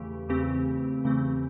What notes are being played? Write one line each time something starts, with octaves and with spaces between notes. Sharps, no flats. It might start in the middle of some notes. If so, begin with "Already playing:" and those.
Already playing: E2 C#3 E3 A3 G4
E2 C#3 E3 A3 C4 G4
E2 C#3 E3 A3 C4